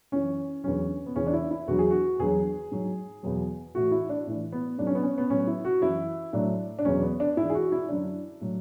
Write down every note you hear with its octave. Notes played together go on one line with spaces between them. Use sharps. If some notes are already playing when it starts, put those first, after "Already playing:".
F#2 E3 C#4
E2 D3 F#3 C#4
B3
E2 C#3 E3 C#4
D4
E4
E4
E2 D3 F#3 F#4
G#4
F#4
E2 D3 F#3 G#4
G#2 F#3
E2 B2 F#3
A2 E3 F#4
E4
D4
A2 E3
B3
G#2 F#3 D4
C#4
B3
C#4
B3
A2 F#3 C#4
E4
F#4
F#2 E3 E4
A2 F#3 D4
D4
E2 B2 F#3 C#4
B3
D4
G#2 E3 E4
G#4
F#4
E4
F#2 D3 F#3 D4
A2 F#3